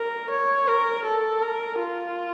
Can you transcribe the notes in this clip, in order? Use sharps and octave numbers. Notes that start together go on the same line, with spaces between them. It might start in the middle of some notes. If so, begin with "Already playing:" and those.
Already playing: A#4
C#5
A#4
A4
A#4
F4